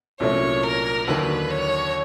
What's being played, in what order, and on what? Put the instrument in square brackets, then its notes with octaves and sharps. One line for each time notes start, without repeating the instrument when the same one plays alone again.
[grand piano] C2 A#2 F#3 A3 C#4 [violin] C#5
[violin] A#4
[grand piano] D#2 D3 F#3 A#3 D#4 [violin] B4
[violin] C#5